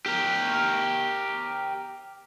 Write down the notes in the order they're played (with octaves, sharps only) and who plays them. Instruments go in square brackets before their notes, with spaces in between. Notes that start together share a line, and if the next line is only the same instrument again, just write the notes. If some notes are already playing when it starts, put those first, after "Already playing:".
[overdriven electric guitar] G4 A#4